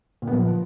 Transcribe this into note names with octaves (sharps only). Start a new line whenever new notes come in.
A#2
B3
F3